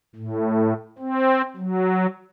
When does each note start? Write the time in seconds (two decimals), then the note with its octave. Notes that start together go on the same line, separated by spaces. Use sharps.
0.16 A2
0.99 C4
1.57 F#3